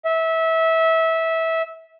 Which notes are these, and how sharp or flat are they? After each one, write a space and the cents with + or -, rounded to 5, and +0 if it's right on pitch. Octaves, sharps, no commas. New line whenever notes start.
E5 -20